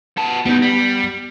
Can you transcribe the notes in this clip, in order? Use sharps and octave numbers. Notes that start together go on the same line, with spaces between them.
B3 A5
G3 B3 D#4
G3